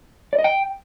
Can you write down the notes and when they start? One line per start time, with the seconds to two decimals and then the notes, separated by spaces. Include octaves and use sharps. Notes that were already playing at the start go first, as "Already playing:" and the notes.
0.33 D5
0.39 D#5
0.44 G5